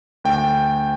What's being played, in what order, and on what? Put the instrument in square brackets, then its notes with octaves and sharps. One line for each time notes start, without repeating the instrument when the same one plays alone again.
[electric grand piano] D2 G5